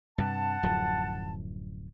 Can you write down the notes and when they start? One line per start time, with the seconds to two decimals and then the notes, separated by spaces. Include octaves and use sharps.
0.18 G2 C3 F#5 A5
0.63 D1 F#2 F3